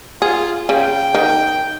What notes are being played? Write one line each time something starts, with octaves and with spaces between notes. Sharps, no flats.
F4 G#4
C#3 G5
D#3